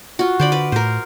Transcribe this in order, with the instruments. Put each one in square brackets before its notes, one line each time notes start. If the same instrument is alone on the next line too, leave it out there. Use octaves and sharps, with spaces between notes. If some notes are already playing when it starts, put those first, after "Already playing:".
[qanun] F4 F#4
[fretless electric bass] D3 [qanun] C5 D5 B5
[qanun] B4 D5
[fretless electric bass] A2 [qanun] A#4 C5